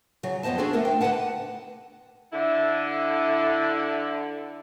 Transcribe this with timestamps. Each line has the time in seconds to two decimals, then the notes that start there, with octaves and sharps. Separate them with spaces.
0.23 C#3 F#3
0.43 F2 B3 C5 D#5 A5
0.58 D4 F#4 G#4 A4 C5
0.73 A3 B3 A#4
0.85 G5
1.00 D3 F#4 B4 F#5 A5
2.33 D3 E4